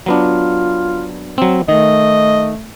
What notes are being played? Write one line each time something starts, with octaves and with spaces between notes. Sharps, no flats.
F#3 B3 D4 F4
F#3 C4
D#3 A3 D#5